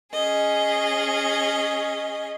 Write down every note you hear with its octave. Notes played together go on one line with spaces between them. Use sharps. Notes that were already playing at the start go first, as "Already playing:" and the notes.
C#4 G#4 D#5